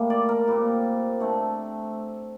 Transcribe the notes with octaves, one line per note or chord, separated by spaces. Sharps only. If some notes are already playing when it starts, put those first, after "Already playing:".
Already playing: A2 G3 A#3
D5
A#4
A#2 G3 C4
D3 A3 C4